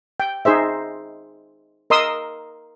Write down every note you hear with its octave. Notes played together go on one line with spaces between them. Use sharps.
G5
D#4 G#4 C5 E5
A#4 D#5 C6 D#6 E6